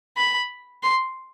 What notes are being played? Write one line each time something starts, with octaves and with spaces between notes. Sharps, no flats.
B5
C6